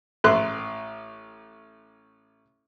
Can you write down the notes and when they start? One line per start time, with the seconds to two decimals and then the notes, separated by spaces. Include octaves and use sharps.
0.24 A1 A3 C6 F#6